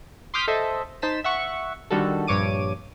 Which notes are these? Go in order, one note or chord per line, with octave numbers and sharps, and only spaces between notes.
C6 D6 D#6 F6 G6 B6
A4 C5 D#5 E5
D#4 C5 A5 B6 E7
E5 F#5 C#6
D3 D#3 G3 F#4 A4
A#1 G2 C#5 D6 D#7